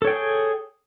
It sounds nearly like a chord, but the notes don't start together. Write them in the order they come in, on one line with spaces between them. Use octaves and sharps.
A4 C#5 G5 G#4